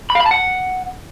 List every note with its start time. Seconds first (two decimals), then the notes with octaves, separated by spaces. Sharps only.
0.10 B5
0.15 F5
0.20 B5
0.26 A5
0.31 F#5